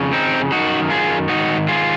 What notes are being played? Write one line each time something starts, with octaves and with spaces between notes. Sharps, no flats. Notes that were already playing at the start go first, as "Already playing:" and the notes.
Already playing: F2 C#3
C4 D#4
F#2 D#3 D#4 F#4
F4 G#4
G#2 D#3 D#4 F#4
F4 G#4